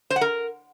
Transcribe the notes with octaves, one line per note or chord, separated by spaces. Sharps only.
C5
F#5
A#4